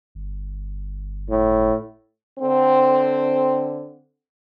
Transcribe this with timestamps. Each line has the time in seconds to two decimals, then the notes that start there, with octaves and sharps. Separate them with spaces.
0.15 G1
1.30 A2
2.39 D3 C4